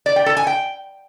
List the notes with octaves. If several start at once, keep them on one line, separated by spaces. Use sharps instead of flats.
D5
G5
A4
G#5
G5